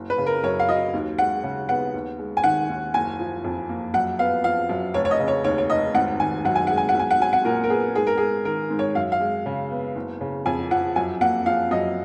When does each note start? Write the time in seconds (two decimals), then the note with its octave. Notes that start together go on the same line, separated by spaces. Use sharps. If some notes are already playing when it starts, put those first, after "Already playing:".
Already playing: F#1
0.10 B4
0.18 C#3
0.26 A#4
0.43 F#2 C#5
0.59 F5
0.69 F#3 D#5
0.94 D#2
1.18 G#3 F#5
1.43 C#3
1.69 B3 F#5
1.93 D#2
2.19 G#3
2.37 G#5
2.44 D#3 F#5
2.69 D#2
2.94 F#1 G#5
3.19 F3
3.45 F2
3.69 A#3
3.94 F#2 F#5
4.19 B3 F5
4.44 F3 F5
4.69 F#2
4.94 F1 C#5
5.05 C#5
5.11 D#5
5.19 C#3
5.28 C#5
5.44 D#2 C#5
5.58 C#5
5.69 F1 D#5
5.94 G#1 F#5
6.20 D#3 G#5
6.45 F#2 F#5
6.56 G#5
6.67 G#3 F#5
6.77 G#5
6.89 F#5
6.95 B1 G#5
7.11 F#5
7.20 F#3 G#5
7.33 F#5
7.45 A#2 A#4
7.64 A#4
7.70 B3 G#4
7.95 G#2 G#4
8.07 A#4
8.18 G#3 G#4
8.45 D#3 A#4
8.70 G#2
8.79 C#5
8.95 F#2 F5
9.12 F5
9.20 G#3
9.46 C#3
9.71 B3
9.96 F#1
10.21 C#3
10.46 F2 G#5
10.71 F3 F#5
10.96 F#2 G#5
11.21 A#3 F#5
11.46 F3 F5
11.71 F#2 D#5